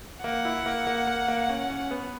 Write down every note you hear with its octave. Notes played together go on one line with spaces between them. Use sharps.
A#3 F#5
E4
A#3
A#3
A#3
A#3
C#4
C#4
B3